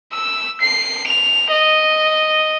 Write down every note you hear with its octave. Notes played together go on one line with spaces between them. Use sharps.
E6
C7
F7
D#5